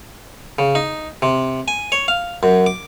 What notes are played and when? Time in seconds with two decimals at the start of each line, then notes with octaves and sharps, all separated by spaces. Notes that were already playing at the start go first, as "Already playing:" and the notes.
0.59 C#3
0.75 D#4
1.22 C3
1.68 G#5
1.92 C#5
2.08 F5
2.43 F#2
2.66 D6